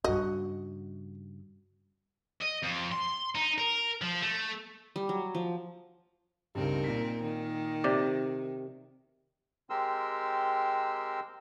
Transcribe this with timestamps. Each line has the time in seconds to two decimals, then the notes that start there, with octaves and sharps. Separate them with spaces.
0.04 G2 C#3 F#4 D#5
2.42 D#5
2.63 F2
2.92 C6
3.35 D#4
3.58 A#4
4.02 F3
4.21 A3
4.96 G3
5.09 F#3
5.35 F3
6.55 C#2 G2 C4 D#4 A#4
6.84 A#2 B6
7.22 D#3
7.84 C3 D5
9.70 G#3 C4 G4 A#4 C6 E6